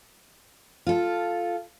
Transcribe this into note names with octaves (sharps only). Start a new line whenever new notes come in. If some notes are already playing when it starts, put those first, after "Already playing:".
F4 A4